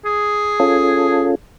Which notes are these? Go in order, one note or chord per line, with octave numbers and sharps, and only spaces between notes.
G#4
C#4 F4 A4